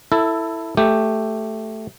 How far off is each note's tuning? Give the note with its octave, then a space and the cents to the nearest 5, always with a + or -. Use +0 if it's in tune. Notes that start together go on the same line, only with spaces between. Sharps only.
E4 +0 A4 +15
A3 +0 G4 +0